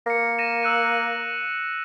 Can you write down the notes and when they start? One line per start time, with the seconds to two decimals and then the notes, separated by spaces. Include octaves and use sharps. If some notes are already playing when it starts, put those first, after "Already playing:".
0.06 A#3 A#6 C#7
0.38 A#6 D#7 E7
0.63 E6 F#6 D#7